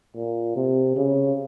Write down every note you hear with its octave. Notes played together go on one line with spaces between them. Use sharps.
A#2
C3
C#3